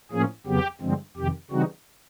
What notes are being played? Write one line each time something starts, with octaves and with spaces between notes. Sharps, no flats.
A2 F3 A#3 C#4 G#4
F2 C#3 F#3 B3 G4
G2 D3 F3 G#3 C4
F2 C3 D#3 G4
C#3 E3 G3 C4 D#4 F#4